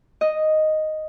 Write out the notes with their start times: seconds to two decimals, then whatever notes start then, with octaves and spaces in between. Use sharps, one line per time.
0.21 D#5